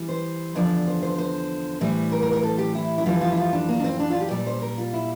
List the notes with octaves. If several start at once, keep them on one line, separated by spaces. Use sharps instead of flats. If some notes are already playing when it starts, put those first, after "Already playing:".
Already playing: E3 G3
C5
E2 D3 F3 D5
C5
C5
C5
A2 E3 G3
A#4
A#4
A#4
A4
G4
E4
E4
F2 E3 G3 F4
F4
E4
F4
D4
A#3
D4
C4
D4
F4
G4
A#2 G3 D5
C5
A#4
F4
E4